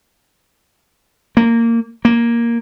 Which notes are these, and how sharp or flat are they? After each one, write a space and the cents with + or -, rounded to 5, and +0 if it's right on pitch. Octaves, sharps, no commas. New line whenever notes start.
A#3 -15
A#3 +5